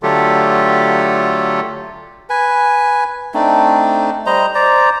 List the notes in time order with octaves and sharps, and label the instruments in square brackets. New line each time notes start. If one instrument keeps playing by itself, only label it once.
[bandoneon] D3 F#3 A3 F4 G4 A4
[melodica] B4 G#5
A3 C4 D4 D#4
G3 C5 D#5 A#5
C5 D5 A#5